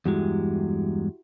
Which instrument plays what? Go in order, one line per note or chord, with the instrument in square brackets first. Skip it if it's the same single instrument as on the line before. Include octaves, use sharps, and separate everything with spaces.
[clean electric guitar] E2 G2 G#3 [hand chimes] E4 F#4 G4